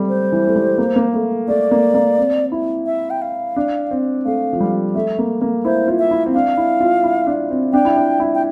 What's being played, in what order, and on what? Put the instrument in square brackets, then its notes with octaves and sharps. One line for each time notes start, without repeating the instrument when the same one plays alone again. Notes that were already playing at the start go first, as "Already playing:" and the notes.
Already playing: [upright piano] G3 A3 C4
[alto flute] C5
[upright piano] E3
A3
G3
A#3
A#3
A3
[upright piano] A3 [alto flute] D5
[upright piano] A#3
A#3
C4
E4
[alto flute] E5
G5
F5
[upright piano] D4
C4
[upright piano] A3 [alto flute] F5
[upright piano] F3
G3
[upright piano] A3 [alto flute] E5
[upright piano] A#3
A#3
[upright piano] E4 [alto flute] C5
[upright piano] F4
[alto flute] E5
[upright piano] E4
C4
[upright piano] D4 [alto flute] F5
[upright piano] E4
F4
E4
D4
C4
[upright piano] D4 [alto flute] G5
[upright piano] E4
D4
E4
[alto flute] G5